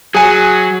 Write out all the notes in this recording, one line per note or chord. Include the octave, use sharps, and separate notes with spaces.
F#3 G#4 G#5